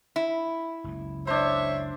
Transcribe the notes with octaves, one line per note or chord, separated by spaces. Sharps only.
E4
F#1 C#2 F#2
D4 C5 C#5 E5